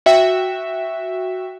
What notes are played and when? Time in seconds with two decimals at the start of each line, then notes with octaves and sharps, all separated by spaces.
0.06 F#4 E5 G5